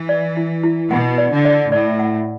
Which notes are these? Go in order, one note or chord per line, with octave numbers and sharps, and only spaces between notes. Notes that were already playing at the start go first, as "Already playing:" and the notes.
Already playing: E3
D5
E4
E4
B2 F#5
D5
D3
D5
A2 D5
F#5